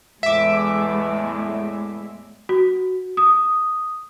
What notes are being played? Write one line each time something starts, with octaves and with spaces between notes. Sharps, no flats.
E2 A2 G#3 E5 D6
F#4
D#6